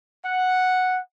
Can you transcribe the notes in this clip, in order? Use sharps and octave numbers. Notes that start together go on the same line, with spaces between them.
F#5